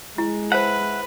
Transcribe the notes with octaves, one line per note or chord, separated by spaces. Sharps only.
G#3 E4
B4 C5 E5 F#5 A5